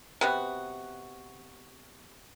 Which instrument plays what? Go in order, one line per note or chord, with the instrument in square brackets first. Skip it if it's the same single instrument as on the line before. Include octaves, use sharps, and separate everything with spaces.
[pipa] C3 B3 F#4